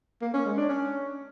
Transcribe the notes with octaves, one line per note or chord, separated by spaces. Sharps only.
A#3
C#4
G#3
D4
C#4